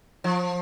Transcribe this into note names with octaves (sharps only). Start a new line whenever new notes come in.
F3